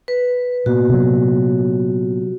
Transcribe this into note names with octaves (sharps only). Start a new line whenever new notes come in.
B4
A#2 A#3 B3 F#4
C3 F#3